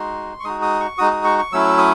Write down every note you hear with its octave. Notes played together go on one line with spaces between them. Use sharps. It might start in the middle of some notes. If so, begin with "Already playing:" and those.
Already playing: G#3 D#4 F#4 C6
C#6
G#3 D#4 F#4 D#6
D#6
C#6
G#3 D#4 F#4 D#6
D#6
C#6
C#6
F#3 A3 C#4 E4 E6
D#6